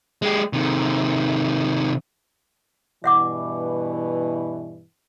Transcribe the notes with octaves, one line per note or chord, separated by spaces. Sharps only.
G#3 G4
C3 D#3
G2 B2 E3 E5 F#5 D6